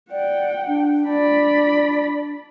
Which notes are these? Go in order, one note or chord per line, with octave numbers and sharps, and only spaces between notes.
D5 F#5 G5
D4
D4 D5 B5